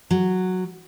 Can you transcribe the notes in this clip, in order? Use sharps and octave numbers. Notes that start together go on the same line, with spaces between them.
F#3